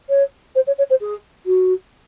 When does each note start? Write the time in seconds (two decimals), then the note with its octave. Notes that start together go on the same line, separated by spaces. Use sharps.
0.10 C#5
0.55 C5
0.67 C#5
0.78 C#5
0.90 C5
1.01 G#4
1.46 F#4